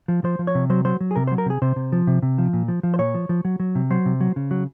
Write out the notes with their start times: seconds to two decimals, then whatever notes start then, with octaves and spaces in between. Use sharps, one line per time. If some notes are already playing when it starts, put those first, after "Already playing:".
0.08 F3
0.24 F3 C5
0.39 F3
0.47 C#5
0.55 C3
0.70 F#3 C5
0.85 F#3 C5
1.01 F#3
1.11 G#4
1.16 C3 A#4
1.27 C5
1.32 F#3
1.38 A#4
1.46 C3 G#4
1.62 C3 C5
1.76 C3
1.92 F3
2.07 C3
2.22 C3
2.38 F3
2.53 A#2
2.68 F3
2.83 F3
2.94 C5
2.99 A#2 C#5
3.14 F3
3.29 F3
3.45 F#3
3.60 F#3
3.75 C3
3.91 F#3 C5
4.06 C3
4.21 F#3
4.36 C#3
4.51 F#3